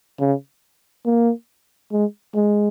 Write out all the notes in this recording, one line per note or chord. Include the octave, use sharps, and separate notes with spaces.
C#3
A#3
G#3
G#3